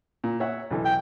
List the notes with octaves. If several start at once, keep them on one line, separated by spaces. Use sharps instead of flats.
A#2
C#5 E5 F#5
B1 E3 A4
G5